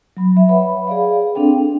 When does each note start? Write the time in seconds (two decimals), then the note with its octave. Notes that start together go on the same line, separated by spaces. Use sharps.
0.17 F#3 B5
0.37 E5
0.49 B4 C#5 F#5 B5
0.87 G#4 D5 F5
1.35 C4 D4 A4 G5
1.58 D4